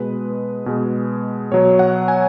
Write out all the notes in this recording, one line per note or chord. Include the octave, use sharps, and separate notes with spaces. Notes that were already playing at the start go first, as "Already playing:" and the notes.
Already playing: B2 G#3 B4
B2 G#3
B2 F#3 C#5
F#5
G#5